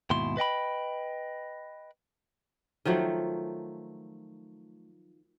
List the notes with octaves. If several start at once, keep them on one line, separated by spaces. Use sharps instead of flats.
D#2 G#2 B2 E4 C6
B4 D#5 G5 B5
D#3 F3 F#3 A3